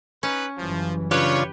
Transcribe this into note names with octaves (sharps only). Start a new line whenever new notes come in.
C#4 D#4 B4
F#1 E3 F3 G3
C#3 D4 F4 G4 B4 C#5